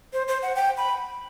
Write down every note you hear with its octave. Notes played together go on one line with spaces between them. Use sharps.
C5
C5
F#5
G5
B5